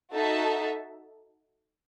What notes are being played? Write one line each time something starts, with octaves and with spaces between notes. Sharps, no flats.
D#4 F#4 A4 E5 A5